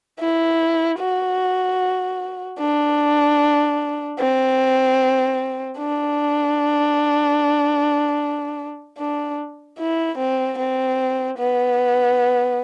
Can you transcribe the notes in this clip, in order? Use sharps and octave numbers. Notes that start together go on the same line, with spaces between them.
E4
F#4
D4
C4
D4
D4
E4
C4
C4
B3